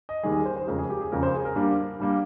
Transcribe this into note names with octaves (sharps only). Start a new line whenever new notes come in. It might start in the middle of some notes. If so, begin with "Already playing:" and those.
D#5
D#2 D#3 G3 G#4
G#4
C5
C5
F2 C#3 G#3 A#4
G#4
G4
G#4
F2 C#3 G#3 A#4
C5
G#4
A#4
G2 G3 A#3
G2 G3 A#3